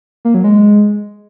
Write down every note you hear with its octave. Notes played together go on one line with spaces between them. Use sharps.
A#3
F#3
G#3